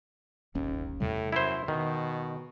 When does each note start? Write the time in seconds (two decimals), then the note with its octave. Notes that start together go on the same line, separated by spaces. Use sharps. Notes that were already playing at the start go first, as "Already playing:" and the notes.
0.55 D1 G1 D#2 C#4
1.00 E2 A2 C3 G3
1.32 F#2 E4 C5
1.68 B2 D#3